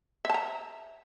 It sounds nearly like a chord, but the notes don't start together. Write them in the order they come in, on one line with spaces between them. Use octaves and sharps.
E5 A5 A#5